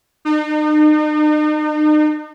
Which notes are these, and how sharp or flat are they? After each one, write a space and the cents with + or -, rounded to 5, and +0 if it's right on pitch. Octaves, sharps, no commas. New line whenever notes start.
D#4 -40